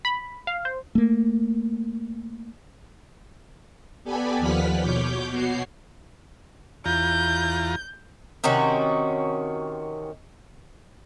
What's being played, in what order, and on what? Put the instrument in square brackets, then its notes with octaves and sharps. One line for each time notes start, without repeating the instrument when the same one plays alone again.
[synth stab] B5
F5
C5
[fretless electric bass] A3 A#3
[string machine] B3 G4 A4 D5 G#5 B5
D#2 F3 B4 F#5 F6 B6
B2 C#5 D6 G6
B2 F#4 C#5 C7
[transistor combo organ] E2 F4 A#5 [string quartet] G6
[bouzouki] C3 D#3 C#4 F#4